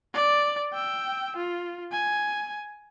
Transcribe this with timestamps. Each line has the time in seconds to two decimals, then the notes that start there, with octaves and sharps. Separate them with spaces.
0.14 D5
0.73 G5 E6
1.36 F4
1.92 G#5